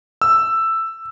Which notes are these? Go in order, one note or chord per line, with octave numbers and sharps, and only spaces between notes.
E6